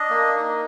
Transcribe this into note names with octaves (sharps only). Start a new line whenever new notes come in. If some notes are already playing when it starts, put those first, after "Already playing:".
Already playing: D4 D#5
A#3
D#4